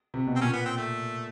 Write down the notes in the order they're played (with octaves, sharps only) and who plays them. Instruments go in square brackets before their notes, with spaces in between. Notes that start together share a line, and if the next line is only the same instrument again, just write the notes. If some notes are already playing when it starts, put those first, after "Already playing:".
[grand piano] C3
B2
[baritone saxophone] C4
[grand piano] A#2 [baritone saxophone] C#4
[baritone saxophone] B3
C4
A3